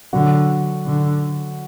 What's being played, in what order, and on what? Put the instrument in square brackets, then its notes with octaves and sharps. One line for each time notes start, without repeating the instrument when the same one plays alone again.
[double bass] D3 [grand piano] F#3 F#4
[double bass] D3